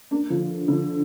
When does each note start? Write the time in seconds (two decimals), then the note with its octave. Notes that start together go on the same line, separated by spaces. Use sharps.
0.11 A#3 D4
0.30 D3 F3
0.68 D3 F3